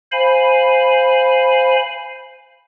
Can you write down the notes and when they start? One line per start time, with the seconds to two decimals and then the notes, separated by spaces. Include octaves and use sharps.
0.12 C5 F5 G#5 B5